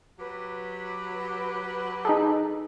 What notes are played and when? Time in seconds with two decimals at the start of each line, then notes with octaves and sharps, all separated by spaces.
0.19 F#3 G4 B4
2.05 D#4 G#4 A4